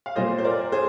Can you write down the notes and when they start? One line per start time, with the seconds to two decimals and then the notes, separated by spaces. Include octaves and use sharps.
0.06 F5
0.16 A#2 G3 A#3 C5 D#5
0.38 C5
0.44 A#4 D5
0.72 G#4 C5